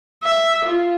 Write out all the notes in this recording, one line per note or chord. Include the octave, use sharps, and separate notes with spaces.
E5
F4